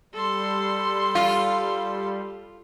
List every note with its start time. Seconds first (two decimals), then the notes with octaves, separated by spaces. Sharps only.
0.14 G3 A4 C6
1.15 F4 F5